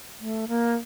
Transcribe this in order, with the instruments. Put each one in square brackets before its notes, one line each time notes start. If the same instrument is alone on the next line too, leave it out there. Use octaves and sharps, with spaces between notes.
[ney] A3
A#3